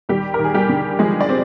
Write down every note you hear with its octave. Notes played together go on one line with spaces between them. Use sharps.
D#2 G3 G4
A#4
D#2
G#4
G3 G4
D3
F3 G#3 G#4
D5
C4